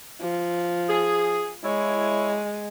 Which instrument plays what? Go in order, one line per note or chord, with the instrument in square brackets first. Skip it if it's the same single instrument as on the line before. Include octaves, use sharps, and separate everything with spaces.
[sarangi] F3
[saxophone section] G#4
[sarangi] G#3 [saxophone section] E4 C#5